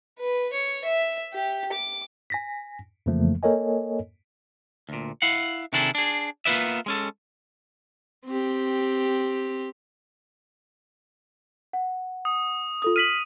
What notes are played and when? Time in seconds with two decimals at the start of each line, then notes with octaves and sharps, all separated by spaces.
0.19 B4
0.53 C#5
0.85 E5
1.33 G4
1.72 D6
2.30 G#5 A#6 B6
3.06 F2 C#3 E3 F3 A3 A#3
3.43 A#3 A4 A#4 C#5 D#5 G#5
4.89 D2 A#2
5.22 E4 F5 F#5
5.73 C3 D#3 D4 E4 G#4 A4
5.95 D4 G#4
6.45 A#3 B3 F4 B4 D5 E5
6.86 G#3 C#4 A4
8.26 C4 G4
11.73 F#5
12.25 D#6
12.82 F4 A4 D#6
12.96 F6 B6 D#7 F#7